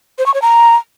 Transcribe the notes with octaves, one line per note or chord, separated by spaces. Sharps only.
C5
C#6
C#5
A#5